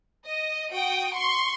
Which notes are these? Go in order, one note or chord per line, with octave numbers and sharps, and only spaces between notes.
D#5
F#4 G5 D#6 D7
C6 C#6